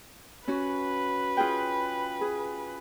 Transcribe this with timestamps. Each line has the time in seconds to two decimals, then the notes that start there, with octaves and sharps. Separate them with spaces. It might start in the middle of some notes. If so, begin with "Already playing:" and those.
0.48 C#4 F#4 B4
1.37 F4 G#4 G5
2.21 G#4